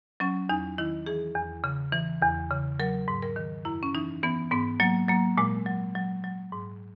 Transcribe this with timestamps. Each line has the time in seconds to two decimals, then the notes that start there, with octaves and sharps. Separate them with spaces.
0.20 F#3 C#4
0.49 E2 D#4
0.78 D#3 E4
1.06 E3 G#4
1.35 E2
1.64 C#3
1.93 E3
2.22 E2
2.51 C#3
2.80 F#3 A#4
3.08 G#2
3.23 A#4
3.36 D#3
3.65 F#2 E4
3.83 C#4
3.95 E3 D#4
4.23 E3 B3
4.51 G#2 B3
4.80 F#3 A#3
5.08 F#3 A#3
5.38 A#2 G#3
5.66 F#3
5.95 F#3
6.24 F#3
6.52 G#2